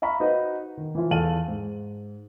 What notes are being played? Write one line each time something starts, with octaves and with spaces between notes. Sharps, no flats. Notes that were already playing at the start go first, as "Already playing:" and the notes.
E5 F5 A#5 B5 C#6
D#4 F#4 B4 C5 D#5
D#3
E3 F3 E4 F4
E2 A4 F5 D#7 F#7
G#2